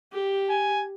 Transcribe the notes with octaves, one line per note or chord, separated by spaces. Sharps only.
G4
G#5